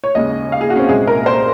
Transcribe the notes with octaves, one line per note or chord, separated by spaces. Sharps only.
C#5
D#2 C#3 G#3 D#5
F5
G#4
F#4
C#4
C4
C2 A#2 G#3 G#4
A#4
C5